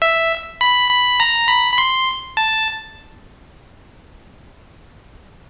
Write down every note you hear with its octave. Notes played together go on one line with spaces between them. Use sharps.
E5
B5
B5
A#5
B5
B5
C6
A5